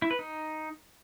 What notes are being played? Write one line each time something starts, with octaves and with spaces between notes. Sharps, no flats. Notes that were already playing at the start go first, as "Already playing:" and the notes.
E4
B4
D#4